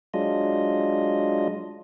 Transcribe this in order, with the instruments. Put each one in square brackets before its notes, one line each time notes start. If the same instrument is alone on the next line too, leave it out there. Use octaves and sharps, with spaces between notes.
[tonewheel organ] F#3 G#3 D4 F4 D#5